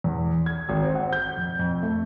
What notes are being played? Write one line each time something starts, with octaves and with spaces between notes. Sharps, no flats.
E2
G#6
G#1
C4
F#5
G6
F2
F2
A3